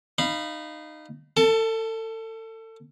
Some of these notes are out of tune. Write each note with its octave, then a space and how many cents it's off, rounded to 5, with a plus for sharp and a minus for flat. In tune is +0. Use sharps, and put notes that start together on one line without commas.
D#4 -20 F5 -15 B5 -5
A4 +30 A5 +0